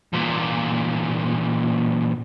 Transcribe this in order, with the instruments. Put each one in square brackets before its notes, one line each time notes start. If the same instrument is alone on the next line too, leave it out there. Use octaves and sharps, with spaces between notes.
[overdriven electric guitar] E2 A#2